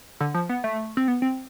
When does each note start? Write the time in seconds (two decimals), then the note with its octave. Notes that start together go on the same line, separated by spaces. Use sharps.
0.20 D3
0.34 F3
0.49 B3
0.64 A3
0.97 C4
1.08 B3
1.22 C4